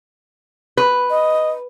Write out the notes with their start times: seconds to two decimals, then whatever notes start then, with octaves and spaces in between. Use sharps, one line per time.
0.77 B4
1.10 D#5